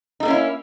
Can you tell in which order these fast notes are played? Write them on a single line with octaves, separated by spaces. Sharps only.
D#4 A3 A#3 C#4 E4